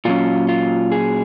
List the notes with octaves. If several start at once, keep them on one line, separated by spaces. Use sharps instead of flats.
A#2 F#3 C#4 F4
F4
G#4